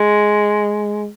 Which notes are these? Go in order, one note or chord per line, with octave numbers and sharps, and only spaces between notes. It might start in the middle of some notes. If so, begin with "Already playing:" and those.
Already playing: G#3